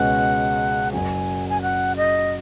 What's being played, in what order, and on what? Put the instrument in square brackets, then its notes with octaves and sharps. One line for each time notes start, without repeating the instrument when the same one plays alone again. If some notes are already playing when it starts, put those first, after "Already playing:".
Already playing: [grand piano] C#2 B2 G#3 C#4 B4 [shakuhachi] F#5
[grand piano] F#1 F#2 C#3 F#3 [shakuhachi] G#5
[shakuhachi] G#5
F#5
D#5